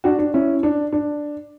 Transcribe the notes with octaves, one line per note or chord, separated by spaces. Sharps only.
D4 F#4
D4
C#4 E4
D4
D4